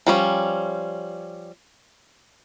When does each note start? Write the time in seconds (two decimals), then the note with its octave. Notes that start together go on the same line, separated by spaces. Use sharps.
0.07 F3 G3 C#4